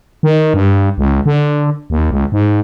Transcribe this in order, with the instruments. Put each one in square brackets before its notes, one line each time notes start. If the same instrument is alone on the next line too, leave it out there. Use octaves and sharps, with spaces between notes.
[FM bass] D#3
G2
C#2
D3
D#2
C#2
G#2